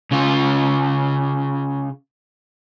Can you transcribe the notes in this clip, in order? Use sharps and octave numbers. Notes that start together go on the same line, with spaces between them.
C#3 F4